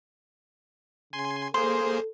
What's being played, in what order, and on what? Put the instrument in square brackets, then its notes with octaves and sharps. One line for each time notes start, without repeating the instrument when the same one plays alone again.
[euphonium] C#3 [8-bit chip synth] G#5 C6
[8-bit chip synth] A#3 G#4 C5 [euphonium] A4 [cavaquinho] C6